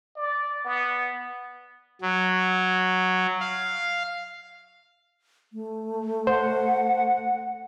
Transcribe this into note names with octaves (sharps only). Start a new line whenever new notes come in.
D5
B3
F#3
F5
A3
C5 F#5